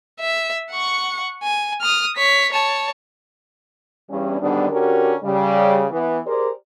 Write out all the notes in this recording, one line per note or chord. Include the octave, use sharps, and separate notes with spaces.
E5
F#5 C#6
G#5
D#6 F6
C#5 B6
C#5 A5
E2 G2 C#4
G#2 D3 D#3 G3 B3 D4
D3 C#4 F#4 G4 A#4
C#3 G3
E3 B3
G4 G#4 A#4 C5 D5